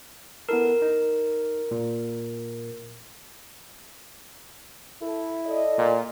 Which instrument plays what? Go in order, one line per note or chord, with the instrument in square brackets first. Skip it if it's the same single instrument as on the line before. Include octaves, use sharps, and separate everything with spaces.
[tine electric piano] B3 E4 A4 [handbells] A#4
[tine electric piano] D#4
A#2
[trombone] E4 [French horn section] A4
[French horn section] A4 D5 D#5
[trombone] A#2